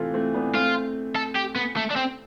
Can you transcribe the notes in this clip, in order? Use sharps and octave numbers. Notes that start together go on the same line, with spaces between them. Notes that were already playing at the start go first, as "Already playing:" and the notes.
Already playing: C3 E3 A3 C4 F4 A4
A3 C4
B3 D4
A3 C4 F4
A4
G4
B3
A3
D4
C4